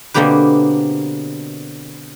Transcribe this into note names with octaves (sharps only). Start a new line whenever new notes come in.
B2 D3 A#3 C4 G4 B4